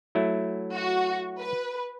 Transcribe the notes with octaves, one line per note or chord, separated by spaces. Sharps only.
F#3 A3 E4
F#4
B4